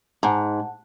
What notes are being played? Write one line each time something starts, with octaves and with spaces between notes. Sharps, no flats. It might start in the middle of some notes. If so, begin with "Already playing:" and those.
G#2 F#5 A5